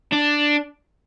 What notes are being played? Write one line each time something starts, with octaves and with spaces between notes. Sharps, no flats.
D4